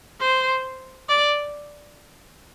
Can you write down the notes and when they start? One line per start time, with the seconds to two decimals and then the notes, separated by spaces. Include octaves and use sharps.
0.21 C5
1.09 D5